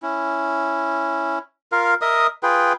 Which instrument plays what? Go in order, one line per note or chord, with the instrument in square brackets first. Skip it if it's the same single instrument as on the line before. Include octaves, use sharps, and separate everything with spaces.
[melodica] C#4 E4
F4 A#4 F5
A#4 D#5 E5 D#6
F4 G#4 B4 G5